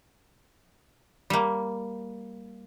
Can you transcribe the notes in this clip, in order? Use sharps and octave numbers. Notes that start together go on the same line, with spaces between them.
G3 A#3